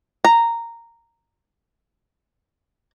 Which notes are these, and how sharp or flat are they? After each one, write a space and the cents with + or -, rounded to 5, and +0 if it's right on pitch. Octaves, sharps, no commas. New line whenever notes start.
A#5 -10